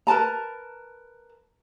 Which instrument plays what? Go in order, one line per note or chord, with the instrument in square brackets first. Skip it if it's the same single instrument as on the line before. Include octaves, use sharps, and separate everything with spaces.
[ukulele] A#4 B4 A5 A#5